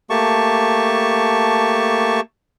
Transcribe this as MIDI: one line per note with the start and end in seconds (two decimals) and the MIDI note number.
0.10 2.20 57
0.10 2.20 58
0.10 2.20 67
0.10 2.20 81
0.10 2.20 85